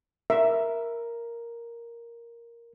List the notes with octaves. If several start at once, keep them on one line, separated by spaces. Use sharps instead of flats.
A#4 E5